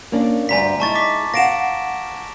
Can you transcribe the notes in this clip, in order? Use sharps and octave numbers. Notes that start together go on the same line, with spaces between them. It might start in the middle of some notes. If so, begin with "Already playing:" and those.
A#3 C#4 D4
D2 G2 G#5 A#5 B6
G#3 D#4 E4 A5 C#6 A6
D6 B6
F5 F#5 A#6 D7 E7